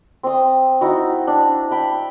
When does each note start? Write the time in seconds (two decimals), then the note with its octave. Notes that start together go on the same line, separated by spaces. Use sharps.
0.23 C4 D#6
0.81 D#4 E4 F#4
1.27 D4
1.71 E5 G5 B5